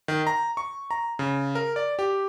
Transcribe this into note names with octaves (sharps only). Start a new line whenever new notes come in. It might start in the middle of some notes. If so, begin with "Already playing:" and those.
D#3
A#5
C#6
A#5
C#3
A#4
D5
G4